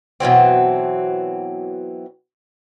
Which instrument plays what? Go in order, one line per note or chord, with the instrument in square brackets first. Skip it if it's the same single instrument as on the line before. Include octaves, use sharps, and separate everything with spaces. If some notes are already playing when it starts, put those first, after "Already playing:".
[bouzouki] B2 E3 F#3 C4